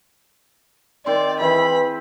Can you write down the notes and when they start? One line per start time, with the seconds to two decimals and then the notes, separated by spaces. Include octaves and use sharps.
1.06 D#3 C4 D5 C6
1.40 E3 C4 E4 G#4 B5